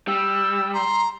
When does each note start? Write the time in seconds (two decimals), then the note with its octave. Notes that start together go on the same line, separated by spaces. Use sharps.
0.08 G3 E6
0.74 A#5 C6